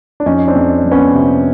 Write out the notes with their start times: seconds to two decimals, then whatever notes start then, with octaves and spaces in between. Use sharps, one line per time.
0.20 D4
0.26 F2 C#4 D#4
0.48 C4 D4
0.55 F2
0.84 F3
0.91 B3 C#4
1.14 C3